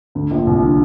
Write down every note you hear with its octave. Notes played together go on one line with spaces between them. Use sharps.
D2 D3
A#1 A#2
C2 C3
D3